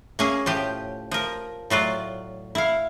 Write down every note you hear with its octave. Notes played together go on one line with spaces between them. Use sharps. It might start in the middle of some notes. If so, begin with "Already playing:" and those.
A#3 C#4 G#4
A2 F3 G4
F3 A#4
A2 F#3 F4 D5
E4 F5